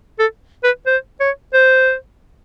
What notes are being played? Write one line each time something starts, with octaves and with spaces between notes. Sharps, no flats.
A4
B4
C5
C#5
C5